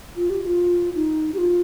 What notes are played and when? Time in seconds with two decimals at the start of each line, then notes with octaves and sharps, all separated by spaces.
0.16 F4
0.30 G4
0.42 G4
0.46 F4
0.95 D#4
1.34 G4
1.38 F4